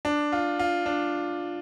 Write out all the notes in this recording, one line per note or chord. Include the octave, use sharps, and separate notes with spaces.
D4
F4
F4
D4